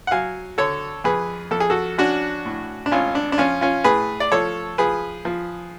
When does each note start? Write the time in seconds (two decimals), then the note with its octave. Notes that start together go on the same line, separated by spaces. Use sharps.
0.07 F#5
0.11 F#3 F5 G#5
0.58 D3 A4 C#5
1.04 F2 G#4 B4
1.51 F2 A4
1.60 G#4
1.70 F#4 A4
1.98 C#4 D4 F#4
2.46 A2
2.86 D4
2.91 G#1 C#4 F4
3.15 D4
3.32 D4
3.38 F3 C#4 F4
3.61 C#4 F4
3.84 A2 G#4 B4
4.20 D5
4.32 F3 A4 C#5
4.78 F3 G#4 B4
5.25 F3